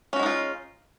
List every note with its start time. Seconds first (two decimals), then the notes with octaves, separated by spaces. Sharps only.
0.13 C#4
0.16 F#4
0.19 G#3
0.23 D#4
0.26 F4